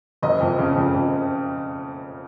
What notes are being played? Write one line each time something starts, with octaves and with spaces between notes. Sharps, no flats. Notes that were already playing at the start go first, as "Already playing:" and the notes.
F#1 D#5
F2
C#3
F2
F2